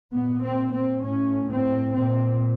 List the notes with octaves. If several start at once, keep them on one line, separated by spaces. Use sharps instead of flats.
A#2 B3
C4
C4
A2 C#4
C4
A#2 C4